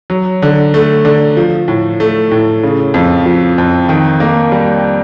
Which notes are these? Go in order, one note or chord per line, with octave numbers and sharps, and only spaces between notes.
F#3
D3
A3
D3
F3
A2
A3
A2
C#3
F2
F3
F2
D#3
A#3
G3